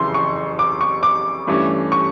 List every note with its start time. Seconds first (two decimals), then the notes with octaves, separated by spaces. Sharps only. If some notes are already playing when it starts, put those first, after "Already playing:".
Already playing: F#1 F2 C#3 E3 C6
0.14 C#6
0.59 D6
0.81 C#6
1.03 D6
1.47 G2 E3 A3 C#4
1.92 C#6